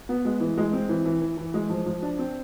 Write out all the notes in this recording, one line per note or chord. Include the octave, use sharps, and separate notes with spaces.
B3
G#3
E3
G#3
C4
E3
E3
E3
E3
G#3
F3
F3
D4
C4